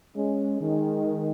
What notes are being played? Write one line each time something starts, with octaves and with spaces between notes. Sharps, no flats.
G#3 C#4
D#3 G#3